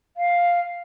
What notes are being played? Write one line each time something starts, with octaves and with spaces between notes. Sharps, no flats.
F5